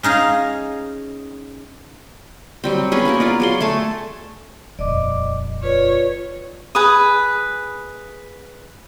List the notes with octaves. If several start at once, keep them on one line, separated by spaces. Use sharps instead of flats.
C#4 D#4 G#4 F5
F#3 G3 C4
B3 C#4 G#4 B4
A#3 B3 F#4 A#4
F4 B4 D5
F#3 G#4 C6
A3 G#5 A5
D#1 F2 D5 D#5 D6
F4 B4 C#5 D5
G#4 B4 D#6